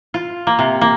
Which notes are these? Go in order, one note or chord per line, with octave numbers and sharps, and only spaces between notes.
F4
A#3
C3
A#3